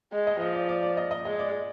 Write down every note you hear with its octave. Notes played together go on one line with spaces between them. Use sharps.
G#3
D#5
F3 D#5
D5
D5
D5
D#5
D#5
G#3 D#5
D5